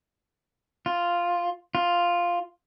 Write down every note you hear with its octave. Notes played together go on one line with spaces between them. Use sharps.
F4
F4